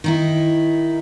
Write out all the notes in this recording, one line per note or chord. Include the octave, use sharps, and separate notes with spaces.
D#3 D#4 E4